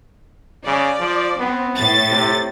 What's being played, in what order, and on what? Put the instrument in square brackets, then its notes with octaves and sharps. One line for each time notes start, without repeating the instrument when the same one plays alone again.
[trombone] C#3 [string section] D5
[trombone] F3
[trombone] B3 [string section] C4
[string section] A2 A6
[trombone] C3